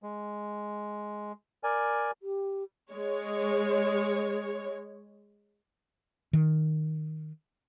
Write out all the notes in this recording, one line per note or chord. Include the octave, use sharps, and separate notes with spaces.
G#3
A#4 D5 G#5
G4
G#3 C#5
D#3